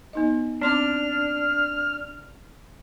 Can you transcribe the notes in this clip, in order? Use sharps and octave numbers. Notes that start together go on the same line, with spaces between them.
B3 D#4 D#5
C4 D4 C6 D6 F6